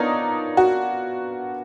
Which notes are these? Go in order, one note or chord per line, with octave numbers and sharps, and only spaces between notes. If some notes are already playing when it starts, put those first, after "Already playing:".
Already playing: B3 D4 D#4 F4 A#4 C#5
F#4